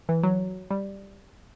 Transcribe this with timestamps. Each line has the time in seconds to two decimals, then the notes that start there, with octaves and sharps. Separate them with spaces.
0.09 E3
0.23 F#3
0.70 G3